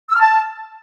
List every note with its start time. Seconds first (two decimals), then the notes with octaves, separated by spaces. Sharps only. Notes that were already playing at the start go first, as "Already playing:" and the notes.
0.09 E6
0.14 F6
0.19 A5